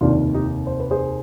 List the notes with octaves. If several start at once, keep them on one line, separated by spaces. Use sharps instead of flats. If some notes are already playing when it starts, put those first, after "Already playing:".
F1 D#2 D#3 D4 F4
D#4 G4
C5
B4
G#4 C5